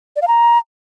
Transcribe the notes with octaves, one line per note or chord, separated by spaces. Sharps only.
D5
F5
A#5